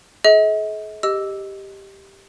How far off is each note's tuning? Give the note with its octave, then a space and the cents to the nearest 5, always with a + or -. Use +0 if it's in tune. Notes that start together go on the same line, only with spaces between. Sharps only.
G#4 +45 D#5 +45
G4 +0 D#5 +0 E6 +0